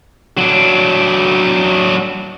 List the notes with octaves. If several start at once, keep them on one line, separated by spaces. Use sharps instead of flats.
F#3 D4